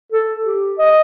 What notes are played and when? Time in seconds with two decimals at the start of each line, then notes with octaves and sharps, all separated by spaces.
0.12 A4
0.45 G4
0.78 D#5